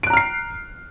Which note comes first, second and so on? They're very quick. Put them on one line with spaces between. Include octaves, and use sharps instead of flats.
D7 F#6 A#5 F6 C7